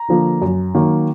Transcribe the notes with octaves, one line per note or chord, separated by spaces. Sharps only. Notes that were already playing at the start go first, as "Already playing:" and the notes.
Already playing: A#5
D3 F3 A#3
F#2
D#3 F#3 A#3